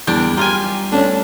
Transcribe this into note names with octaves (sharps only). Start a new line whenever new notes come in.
E2 G3 D4 G6 D7
F4 G4 G#5 A#5 F6
A3 C#4 D4